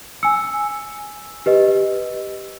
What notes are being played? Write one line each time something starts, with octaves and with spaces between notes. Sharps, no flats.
G#5 E6 C#7
G4 B4 D#5